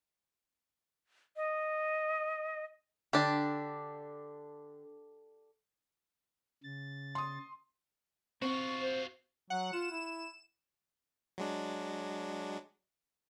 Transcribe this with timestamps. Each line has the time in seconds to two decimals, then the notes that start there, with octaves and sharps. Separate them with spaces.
1.36 D#5
3.13 D3 D4 G4
6.64 C#3 A6
7.15 C6 D#6
8.42 C4 F4 F#4 C#6
8.80 C5
9.50 F#3 F#5
9.73 F4 E7
9.91 E4
11.38 F#3 G#3 D4